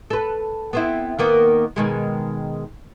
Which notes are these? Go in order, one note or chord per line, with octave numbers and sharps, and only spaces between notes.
A4 B4
B3 C4 E4
D#3 A#3 B3
B2 D#3 G#3